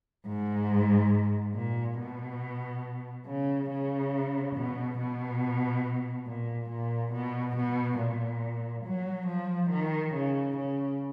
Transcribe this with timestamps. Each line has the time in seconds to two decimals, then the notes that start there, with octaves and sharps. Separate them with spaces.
0.26 G#2
1.54 A#2
1.98 B2
3.26 C#3
3.70 C#3
4.55 B2
4.99 B2
6.26 A#2
6.70 A#2
7.13 B2
7.56 B2
7.99 A#2
8.85 F#3
9.27 F3
9.70 D#3
10.14 C#3
10.57 C#3